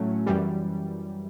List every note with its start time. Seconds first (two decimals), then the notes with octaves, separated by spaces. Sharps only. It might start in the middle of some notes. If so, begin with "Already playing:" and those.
Already playing: A2 F#3 A3 C#4
0.26 F#2 E3 G3